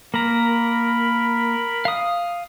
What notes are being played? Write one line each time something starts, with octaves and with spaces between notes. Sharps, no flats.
A#3 A#4 A#5 B5
F5 D#6